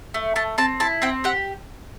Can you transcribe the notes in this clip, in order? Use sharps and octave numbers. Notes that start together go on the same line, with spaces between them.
A3
A3 A5
C4 A5
E4 A5
C4 G5
G4 F#5